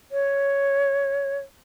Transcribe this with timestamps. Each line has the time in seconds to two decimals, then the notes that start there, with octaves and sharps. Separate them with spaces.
0.12 C#5